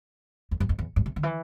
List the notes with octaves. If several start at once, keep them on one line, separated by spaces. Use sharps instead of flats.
F2
G2
F2
E2
G2
C3
D3
E3